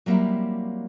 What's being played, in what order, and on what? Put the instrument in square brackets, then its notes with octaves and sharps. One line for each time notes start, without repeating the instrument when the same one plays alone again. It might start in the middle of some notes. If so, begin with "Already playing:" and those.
[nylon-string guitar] F#3 G3 A#3 C4 E4 G4